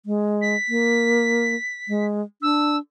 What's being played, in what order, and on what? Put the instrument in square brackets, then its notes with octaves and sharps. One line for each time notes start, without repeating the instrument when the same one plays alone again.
[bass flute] G#3
[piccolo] B6
[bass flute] A#3
G#3
[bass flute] D4 [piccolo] E6